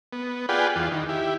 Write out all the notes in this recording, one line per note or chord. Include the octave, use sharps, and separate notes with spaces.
B3
F4 G#4 B4 D5 F#5 G5
E2 F4
D#3
E4 G4